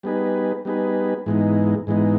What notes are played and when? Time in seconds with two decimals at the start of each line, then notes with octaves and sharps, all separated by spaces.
0.03 G3 B3 D#4 G#4 B4
0.65 G3 B3 D#4 G#4 B4
1.26 G#2 E3 G#3 B3 D#4
1.87 G#2 E3 G#3 B3 D#4